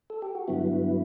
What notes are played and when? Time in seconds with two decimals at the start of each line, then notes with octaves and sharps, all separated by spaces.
0.10 A4
0.22 G4
0.35 F#4
0.48 G2 D3 F#3 B3 E4